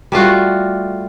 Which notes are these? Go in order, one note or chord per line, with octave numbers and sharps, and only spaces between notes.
G3 A3 F4 F#4